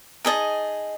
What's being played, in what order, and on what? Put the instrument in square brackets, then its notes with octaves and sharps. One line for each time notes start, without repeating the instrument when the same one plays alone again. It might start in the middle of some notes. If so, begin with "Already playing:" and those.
[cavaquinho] D#4 G#4 D#5 A5